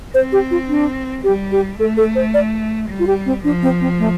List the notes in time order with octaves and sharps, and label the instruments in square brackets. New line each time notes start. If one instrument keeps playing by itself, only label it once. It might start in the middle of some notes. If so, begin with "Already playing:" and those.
[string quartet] C4 [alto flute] C5
[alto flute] G4
F4
D4
[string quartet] G3 [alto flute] G4
[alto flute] G4
[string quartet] A3 [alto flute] A4
[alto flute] A4
C5
D5
[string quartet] G3
[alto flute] F4
G4
C4
[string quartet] F3 [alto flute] D4
[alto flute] C4
C4
A3